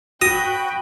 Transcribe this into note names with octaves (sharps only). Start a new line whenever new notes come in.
F#4 G5 B5 D#6 A#6